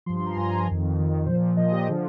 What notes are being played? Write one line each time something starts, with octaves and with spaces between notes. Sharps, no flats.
G2 F3 C6
C6
A#5
G2 F3 G#5
F2 D#3
F2 D#3
A#2 F3 C5
A#2 F3 D#5
G4
D3 F3 G#4